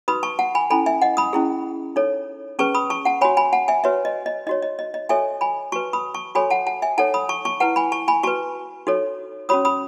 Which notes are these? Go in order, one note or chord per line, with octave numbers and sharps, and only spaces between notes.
D#4 F#4 B4 B5 D#6
A5 C#6
F#5 A5
G#5 B5
C#4 E4 A4 G#5 B5
E5 G#5
D#5 F#5
B5 D#6
C#4 E4 G#4
D#4 A4 C#5
C#4 G#4 B4 A5 C#6
B5 D#6
A5 C#6
F#5 A5
F#4 C#5 G#5 B5
G#5 B5
F#5 A5
E5 G#5
F#4 B4 C#5 E5
D#5
D#5
D#4 F#4 C#5 D#5
D#5
D#5
D#5
F#4 A4 C#5 E5 G#5
G#5 B5
F#4 B4 A5 C#6
B5 D#6
A5 C#6
F#4 A4 C#5 G#5 B5
F#5 A5
F#5 A5
E5 G#5
D#4 A4 C#5 F#5 A5
B5 D#6
A5 C#6
A5 C#6
E4 B4 F#5 A5
G#5 B5
A5 C#6
G#5 B5
F#4 B4 A5 C#6
D#4 F#4 A4 C#5
C#4 F#4 C#5 B5 D#6
B5 D#6